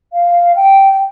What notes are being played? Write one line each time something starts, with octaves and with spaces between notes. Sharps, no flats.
F5
G5